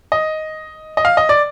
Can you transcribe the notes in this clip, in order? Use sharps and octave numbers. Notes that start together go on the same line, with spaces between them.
D#5
D#5
F5
D#5
D5